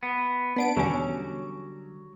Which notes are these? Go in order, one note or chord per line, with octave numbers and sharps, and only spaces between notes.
B3
B3 D4 D7
E2 B2 D3 F#3 G3 C#4